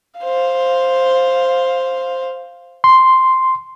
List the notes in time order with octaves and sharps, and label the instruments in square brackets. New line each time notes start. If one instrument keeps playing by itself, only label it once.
[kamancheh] C5 F5
[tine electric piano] C6